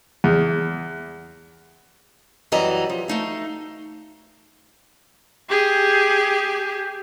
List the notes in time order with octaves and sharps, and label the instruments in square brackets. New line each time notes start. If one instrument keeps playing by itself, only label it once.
[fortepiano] E2
[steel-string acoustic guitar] F#2 E3 G3 F#4 D#5 A#5
F3
A3 D#4 F5
[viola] G4 G#4